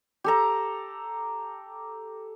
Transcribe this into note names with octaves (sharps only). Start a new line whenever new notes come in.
G4 A4 A#5